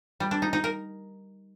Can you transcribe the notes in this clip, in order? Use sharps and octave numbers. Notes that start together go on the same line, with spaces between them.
G3
D4
D#4
D#4
A#4